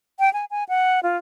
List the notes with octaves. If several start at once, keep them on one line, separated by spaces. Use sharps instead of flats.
G5
G#5
G#5
F#5
F4